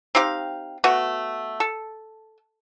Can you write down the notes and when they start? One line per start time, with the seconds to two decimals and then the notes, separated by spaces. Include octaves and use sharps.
0.15 C4 D#4 G4 F5
0.84 A3 B3 F#4
1.60 A4